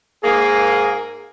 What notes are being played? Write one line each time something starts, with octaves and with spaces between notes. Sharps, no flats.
G#2 A#3 G#4